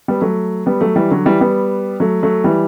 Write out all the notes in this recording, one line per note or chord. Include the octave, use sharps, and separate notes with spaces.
G3 B3
F#3 A3
G3 B3
F#3 A3
E3 G3
D3 F#3
E3 G3
G3 B3
F#3 A3
F#3 A3
E3 G3